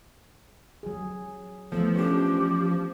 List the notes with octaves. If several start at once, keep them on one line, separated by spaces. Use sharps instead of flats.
F#3 G#4
E3 F3 A3 B3 A4
C#4 D4 G4